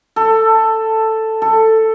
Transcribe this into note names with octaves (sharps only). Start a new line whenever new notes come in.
A4
A4